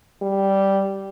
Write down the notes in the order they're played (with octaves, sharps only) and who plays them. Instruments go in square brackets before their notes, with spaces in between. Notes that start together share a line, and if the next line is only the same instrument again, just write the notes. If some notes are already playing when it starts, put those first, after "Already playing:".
[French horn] G3